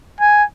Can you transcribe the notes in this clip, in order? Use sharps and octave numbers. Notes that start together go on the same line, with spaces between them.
G#5